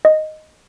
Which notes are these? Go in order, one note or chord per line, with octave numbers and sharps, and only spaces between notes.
D#5